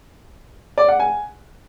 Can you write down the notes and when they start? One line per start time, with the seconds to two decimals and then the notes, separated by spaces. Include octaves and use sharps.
0.78 D5
0.89 F#5
1.00 G#5